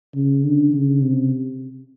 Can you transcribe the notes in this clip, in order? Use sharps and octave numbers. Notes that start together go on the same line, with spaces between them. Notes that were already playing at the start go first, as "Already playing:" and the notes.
C#3
D3
C#3
C3